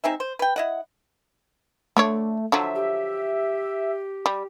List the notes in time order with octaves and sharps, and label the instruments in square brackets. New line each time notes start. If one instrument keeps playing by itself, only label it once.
[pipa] C4 D#4 G#4 E5
C5
B4 G5
E4 D#5 F#5
[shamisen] D3 D4 C#5 [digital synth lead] A3
[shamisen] D3 F3 F#3 [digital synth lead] E5
[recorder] G4
[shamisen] G3